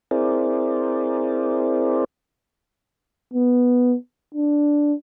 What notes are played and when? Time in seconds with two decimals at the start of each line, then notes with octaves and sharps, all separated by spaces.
0.11 C4 E4 G#4 A#4 C5 D5
3.34 B3
4.35 D4